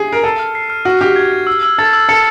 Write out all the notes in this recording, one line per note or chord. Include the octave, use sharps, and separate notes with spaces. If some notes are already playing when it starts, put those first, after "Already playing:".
Already playing: G4 G#4
A#4 C7
A4 D#7
F6
C7
F6
F#4 F6
G4 F6
G#6
C7
E6
E6
A4 A6
E6
A4 C#7